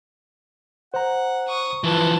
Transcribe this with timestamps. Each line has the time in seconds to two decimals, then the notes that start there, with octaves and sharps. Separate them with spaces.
0.94 C5 F#5 A#5
1.48 C#6 D#6
1.84 E3 F3 B4 A5